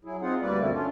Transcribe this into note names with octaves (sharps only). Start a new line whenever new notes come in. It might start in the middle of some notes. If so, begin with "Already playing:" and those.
F#3 E4 G#4
C4 D#4 F4 G#4 F#5
D2 G3 A#3 B4 D5
F#2 B2 D3 A3 C4 E4
C#4 D4 F4